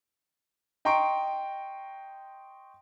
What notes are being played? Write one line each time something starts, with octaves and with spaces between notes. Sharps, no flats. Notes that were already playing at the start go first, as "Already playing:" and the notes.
D#5 G5 A#5 C6 C#6 D7